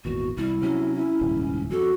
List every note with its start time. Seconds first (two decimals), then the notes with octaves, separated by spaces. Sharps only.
0.05 G#1 E2 A#2 F#4
0.37 C2 G3 E4
0.62 C3 F#3 C#4
0.95 E4
1.21 D#1 C#2 G#2
1.71 F2 F#4 A4